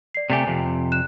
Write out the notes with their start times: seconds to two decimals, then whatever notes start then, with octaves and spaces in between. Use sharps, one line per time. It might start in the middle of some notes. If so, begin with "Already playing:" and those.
0.15 D5 C7
0.30 C3 A3 G4 D5 G#5
0.47 F2 C3
0.92 F#6 E7